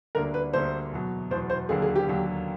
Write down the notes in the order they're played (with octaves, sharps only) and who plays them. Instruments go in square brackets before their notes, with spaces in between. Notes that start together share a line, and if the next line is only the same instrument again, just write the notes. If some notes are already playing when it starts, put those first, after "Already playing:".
[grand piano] D2 D3 G3 A#3 D4 [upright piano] A#4
[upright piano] B4
[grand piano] D2 D3 G3 A#3 D4 [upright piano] C5
[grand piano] E2 B2 F#3
[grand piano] E2 B2 F#3 [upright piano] C5
[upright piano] C5
[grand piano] D#2 D3 F#3 A#3 [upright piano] G#4
[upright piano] G#4
G4
[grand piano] D#2 D3 F#3 A#3